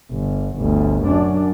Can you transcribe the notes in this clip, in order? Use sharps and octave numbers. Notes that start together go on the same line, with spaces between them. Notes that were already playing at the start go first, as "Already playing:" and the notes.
G1
G1 D2
F#2 D4